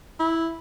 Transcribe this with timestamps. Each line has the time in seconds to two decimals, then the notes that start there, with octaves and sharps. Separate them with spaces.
0.19 E4